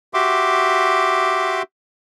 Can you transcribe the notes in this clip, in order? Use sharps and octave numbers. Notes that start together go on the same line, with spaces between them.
F#4 G4 E5 C6 D6